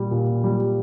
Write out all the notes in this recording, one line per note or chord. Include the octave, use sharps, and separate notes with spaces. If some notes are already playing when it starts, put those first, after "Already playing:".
Already playing: A#2 G3
A#2
G3